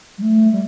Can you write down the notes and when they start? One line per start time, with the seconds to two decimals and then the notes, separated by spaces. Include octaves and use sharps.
0.18 G3
0.22 A3
0.52 G3